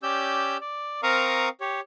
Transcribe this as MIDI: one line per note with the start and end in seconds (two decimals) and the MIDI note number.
0.03 0.57 61
0.03 0.57 67
0.03 0.57 74
0.03 0.57 88
0.03 0.57 91
0.61 1.01 74
1.03 1.49 60
1.03 1.49 70
1.03 1.49 77
1.03 1.49 82
1.03 1.49 85
1.03 1.49 87
1.60 1.81 67
1.60 1.81 73